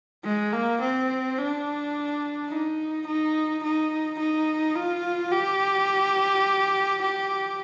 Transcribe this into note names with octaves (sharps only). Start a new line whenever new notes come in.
G#3
A#3
C4
D4
D#4
D#4
D#4
D#4
F4
G4
G4